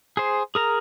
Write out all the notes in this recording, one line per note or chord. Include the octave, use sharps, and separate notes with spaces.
G#4 C5
G#4 A#4 A#5